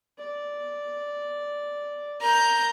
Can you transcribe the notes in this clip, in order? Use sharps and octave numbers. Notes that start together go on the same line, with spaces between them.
D5
A#4 A#5 G6